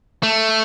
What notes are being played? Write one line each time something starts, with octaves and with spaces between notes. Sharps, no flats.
A3